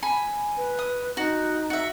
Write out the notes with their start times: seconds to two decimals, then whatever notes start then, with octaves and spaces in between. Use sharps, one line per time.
0.03 G#5 B5
0.57 B4
0.79 D#6
1.17 D#4 F#4
1.70 F#4 E5